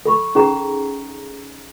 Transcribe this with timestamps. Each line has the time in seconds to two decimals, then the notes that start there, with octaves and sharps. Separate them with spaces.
0.05 A4 B5 C#6
0.35 C#4 D#4 G#4 F#5 A#5